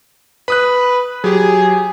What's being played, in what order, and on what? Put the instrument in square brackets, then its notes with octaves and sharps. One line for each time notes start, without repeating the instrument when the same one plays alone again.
[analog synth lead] B4 [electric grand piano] B5 D#6 F#6
[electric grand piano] F#3 G4 [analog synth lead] G#4